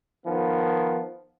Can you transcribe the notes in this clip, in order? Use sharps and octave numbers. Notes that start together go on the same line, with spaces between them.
D#3 F3 B3